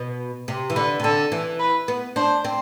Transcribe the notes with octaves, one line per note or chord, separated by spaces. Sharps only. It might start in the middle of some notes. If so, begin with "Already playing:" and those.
Already playing: B2
C3
E3
D3 B4
C3
D3 A4
E3
B4
B3
D4 C5
C4